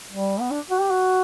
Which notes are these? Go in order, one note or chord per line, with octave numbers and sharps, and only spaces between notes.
G3
B3
D4
F#4
G4
F#4